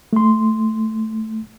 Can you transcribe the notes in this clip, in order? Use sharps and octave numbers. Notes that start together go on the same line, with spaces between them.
A3 C6